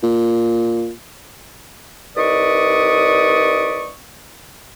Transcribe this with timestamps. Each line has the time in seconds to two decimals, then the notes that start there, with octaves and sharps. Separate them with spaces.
0.03 A#2
2.17 C2 D#4 B4 D5 C#6 D#6